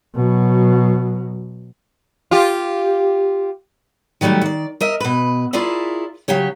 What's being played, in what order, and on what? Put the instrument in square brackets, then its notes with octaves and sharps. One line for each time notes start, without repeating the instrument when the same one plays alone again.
[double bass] B2 F#3
[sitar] F4 G4
[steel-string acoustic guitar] D#3 F#3 G3 A3 G4
D#3 D5
A#4 D#5 E5
B2 B4
E4 F4 G#4 A#4 D5 E5
C#3 F#3 G4 C#5